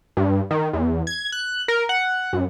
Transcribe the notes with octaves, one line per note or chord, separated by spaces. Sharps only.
G2
D#3
E2
G#6
F#6
A#4
F#5
F#2